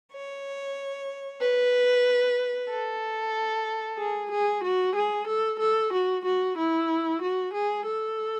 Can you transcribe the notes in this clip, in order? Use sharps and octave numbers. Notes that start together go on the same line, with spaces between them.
C#5
B4
A4
G#4
G#4
F#4
G#4
A4
A4
F#4
F#4
E4
F#4
G#4
A4